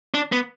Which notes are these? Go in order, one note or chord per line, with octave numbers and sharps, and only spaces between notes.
D4
B3